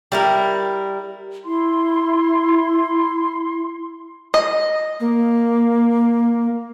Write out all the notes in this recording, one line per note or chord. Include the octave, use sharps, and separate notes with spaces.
G3 E4 A#4
E4 C6
D#5
A#3